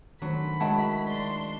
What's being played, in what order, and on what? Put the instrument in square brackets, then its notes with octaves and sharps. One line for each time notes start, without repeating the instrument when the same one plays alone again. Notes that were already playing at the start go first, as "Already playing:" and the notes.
[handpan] D#3 A3 C5 [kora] F#3 [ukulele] D4 [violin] B5
[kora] D#3 F#3 E4 [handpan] G#3 F#4 [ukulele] C#5 F#5 A5
[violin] D4 C6 [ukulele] D5